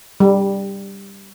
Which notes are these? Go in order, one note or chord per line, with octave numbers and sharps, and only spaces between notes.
G3